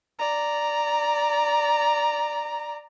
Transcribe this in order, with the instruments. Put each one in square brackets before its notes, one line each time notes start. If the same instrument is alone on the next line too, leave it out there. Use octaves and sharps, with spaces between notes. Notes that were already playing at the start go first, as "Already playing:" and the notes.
[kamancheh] D5 A#5